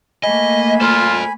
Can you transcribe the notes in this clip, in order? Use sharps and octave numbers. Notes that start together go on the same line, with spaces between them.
A3 A#3 D#5 G#5 B5
F4 A4 C5